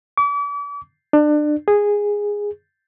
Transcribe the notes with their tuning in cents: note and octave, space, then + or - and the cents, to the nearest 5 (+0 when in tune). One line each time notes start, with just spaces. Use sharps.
D6 -40
D4 +30
G#4 -10